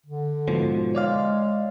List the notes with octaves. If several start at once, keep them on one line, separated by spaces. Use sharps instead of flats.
D3
G#2 B2 F3
G#3 C#5 D5 F5